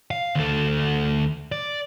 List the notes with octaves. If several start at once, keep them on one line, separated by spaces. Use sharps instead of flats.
F5
D2 A4
D5